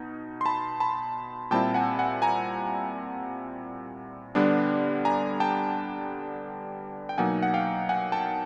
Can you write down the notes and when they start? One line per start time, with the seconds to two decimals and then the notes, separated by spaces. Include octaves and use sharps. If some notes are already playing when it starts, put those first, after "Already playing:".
Already playing: B2 D#4
0.41 C6
0.46 A5 B5
0.80 A5 B5
1.51 A#2 G3 C4 E4 G5 A5
1.74 F#5 G#5
1.99 F#5 G#5
2.22 G#5 A#5
4.35 D3 G3 B3 D4
5.05 G#5 A#5
5.40 G5 A5
7.09 G5
7.18 B2 F#3 A#3 D#4 F#5 G#5
7.43 F#5
7.54 F5 G5
7.89 F#5 G#5
8.12 G5 A5